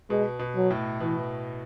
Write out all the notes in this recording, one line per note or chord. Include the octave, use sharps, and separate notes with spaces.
B2 G#3
B2
F#3
A2
B2 E3